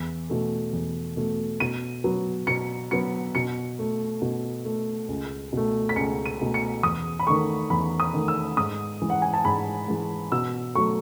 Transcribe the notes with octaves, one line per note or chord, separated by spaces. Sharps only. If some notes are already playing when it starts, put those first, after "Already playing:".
Already playing: E2
B2 A3
E2
B2 A3
B2 D#7
F#3 B3
B2 C#7
F#3 B3 C#7
B2 C#7
A3
B2
A3
C#2
B2 A3
B6
C#2 C#7
D#7
B2 A3
C#7
E2 D#6
B5
D#3 A3 C#6
E2 B5
D#6
D#3 A3
E6
G#2 D#6
E3 G#3
F#5
G#5
A5
G#2 B5
E3 G#3
B2 E6
F#3 A3 C#6